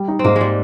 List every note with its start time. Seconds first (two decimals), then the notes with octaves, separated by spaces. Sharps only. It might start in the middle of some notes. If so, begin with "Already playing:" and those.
Already playing: G3
0.08 D#4
0.19 C4
0.24 G#2 A#3
0.36 G#3
0.41 G3